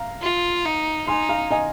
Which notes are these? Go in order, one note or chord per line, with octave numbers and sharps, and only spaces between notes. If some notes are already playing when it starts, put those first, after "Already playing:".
Already playing: F5 A#5
F4
D#4
D#4 G#5 C6
F5 A#5
D#5 G#5